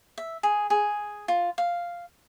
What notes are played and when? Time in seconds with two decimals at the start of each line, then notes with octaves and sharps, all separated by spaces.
0.18 E5
0.43 G#4
0.70 G#4
1.28 F4
1.58 F5